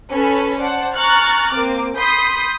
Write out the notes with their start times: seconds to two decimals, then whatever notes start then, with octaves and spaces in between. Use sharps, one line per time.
0.11 C#4 A4 B4 G#5 B5
0.60 C5 D5 F#5 A5
0.94 G#5 A#5 C#6 F6 F#6 A6
1.52 A#3 C4 D6
1.97 B5 C6 D#6 G6 B6 C7